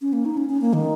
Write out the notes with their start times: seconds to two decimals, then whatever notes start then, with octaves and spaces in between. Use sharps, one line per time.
0.02 C#4
0.13 A#3
0.25 D#4
0.37 C#4
0.49 C#4
0.61 A#3
0.73 D#3